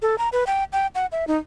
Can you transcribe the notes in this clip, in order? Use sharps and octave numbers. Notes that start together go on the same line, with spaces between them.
A4
A#5
B4
G5
G5
F#5
E5
D#4